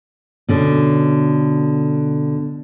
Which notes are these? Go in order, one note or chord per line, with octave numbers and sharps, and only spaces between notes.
B2 D3 C#4